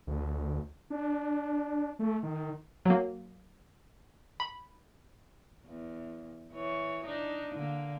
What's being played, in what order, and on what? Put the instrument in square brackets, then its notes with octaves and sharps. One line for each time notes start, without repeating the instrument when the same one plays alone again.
[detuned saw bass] D2
D4
A3
D#3
[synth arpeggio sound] F#3 A#3
B5
[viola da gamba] E2
E3 C#5
D4 D#4
D3 A#3